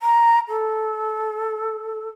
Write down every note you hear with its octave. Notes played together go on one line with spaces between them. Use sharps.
A#5
A4